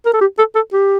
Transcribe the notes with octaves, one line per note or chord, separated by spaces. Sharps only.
A#4
A4
G4
A4
A4
G4